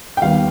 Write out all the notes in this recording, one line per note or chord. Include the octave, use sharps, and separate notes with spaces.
G5
D#2 D#3 G3 B3 F5